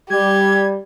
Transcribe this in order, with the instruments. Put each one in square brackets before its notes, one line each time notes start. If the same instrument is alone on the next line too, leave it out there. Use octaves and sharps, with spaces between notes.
[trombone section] G3 [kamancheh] G4 [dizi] G#6